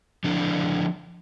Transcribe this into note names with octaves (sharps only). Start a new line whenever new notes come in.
D3 F3 D4 E4